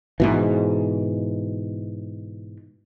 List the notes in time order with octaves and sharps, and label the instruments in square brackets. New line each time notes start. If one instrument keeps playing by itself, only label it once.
[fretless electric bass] G#2 B2 E3